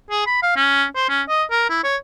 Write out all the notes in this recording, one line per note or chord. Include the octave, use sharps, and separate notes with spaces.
G#4
B5
F5
C#4
C5
C#4
D#5
A#4
E4
C#5